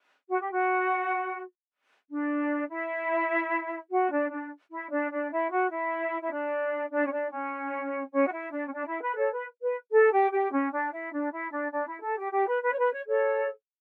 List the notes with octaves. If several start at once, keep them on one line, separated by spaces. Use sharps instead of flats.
F#4
G4
F#4
D4
E4
F#4
D4
D4
E4
D4
D4
E4
F#4
E4
E4
D4
D4
C#4
D4
C#4
C#4
F#4
E4
D4
C#4
D4
E4
B4
A4 C#5
B4
B4
A4
G4
G4
C#4
D4
E4
D4
E4
D4
D4
E4
A4
G4
G4
B4
B4
C#5
B4
C#5
A4 C#5